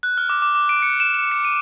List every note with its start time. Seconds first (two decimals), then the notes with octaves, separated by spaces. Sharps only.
0.03 F#6
0.18 F6
0.29 D6
0.42 D6
0.55 D6
0.69 D7
0.82 C#7
1.00 E7
1.15 E7
1.32 C#7
1.45 D#7